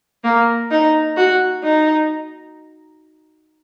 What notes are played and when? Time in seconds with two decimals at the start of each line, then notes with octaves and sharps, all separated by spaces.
0.24 A#3
0.71 D#4
1.17 F#4
1.64 D#4